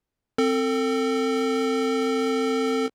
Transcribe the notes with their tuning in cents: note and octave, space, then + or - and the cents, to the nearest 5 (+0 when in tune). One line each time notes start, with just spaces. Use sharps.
C4 +0 A4 +30